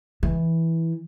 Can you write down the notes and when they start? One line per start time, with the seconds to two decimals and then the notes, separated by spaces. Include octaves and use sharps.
0.23 E3